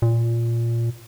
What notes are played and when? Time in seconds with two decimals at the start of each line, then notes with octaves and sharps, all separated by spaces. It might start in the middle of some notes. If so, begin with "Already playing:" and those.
0.02 A#2